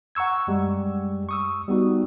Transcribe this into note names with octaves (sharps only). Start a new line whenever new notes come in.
F#5 A#5 C#6 E6 G#6
F#2 G3 G#3
C#6 D#6 E6
G3 B3 D#4 F#4